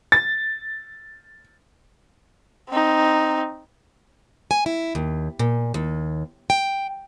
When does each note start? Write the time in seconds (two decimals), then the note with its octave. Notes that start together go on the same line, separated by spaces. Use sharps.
0.12 A6
2.70 C4 D#4
4.51 G#5
4.66 E4
4.95 D#2
5.39 A#2
5.74 D#2
6.50 G5